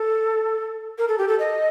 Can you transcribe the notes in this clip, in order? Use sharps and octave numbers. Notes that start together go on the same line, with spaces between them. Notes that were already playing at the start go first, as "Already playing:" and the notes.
Already playing: A4
A#4
A4
G4
A4
D#5